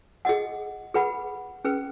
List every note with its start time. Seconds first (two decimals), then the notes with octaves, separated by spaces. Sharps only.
0.25 G#4 D#5 F#5
0.94 G#4 B4 F#5 B5
1.64 C#4 G#4 B4